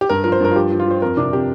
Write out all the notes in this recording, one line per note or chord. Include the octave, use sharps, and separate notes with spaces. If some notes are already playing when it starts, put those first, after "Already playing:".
G4
G2 A#4
F3 A#4
C5
G2 A#4
F4
F3 G4
F3
F4
F3 C5
F2 A#4
C3 D4
C3 G4